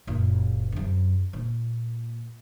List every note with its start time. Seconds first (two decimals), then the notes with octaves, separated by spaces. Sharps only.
0.07 F#1 A#2
0.72 F#2 C3
1.33 A#2